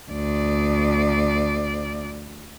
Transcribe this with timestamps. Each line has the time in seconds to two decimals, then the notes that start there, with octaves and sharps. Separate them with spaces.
0.12 D2 D5